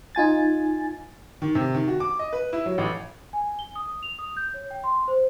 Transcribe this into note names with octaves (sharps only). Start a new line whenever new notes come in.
D#4 F4 G#5 A6
D#3
C3
D#3
F#4
D6
D#5
B4
E4
F#3
A1
G#5
G7
D#6
F7
D#6
G6
C#5
G5
C6
C5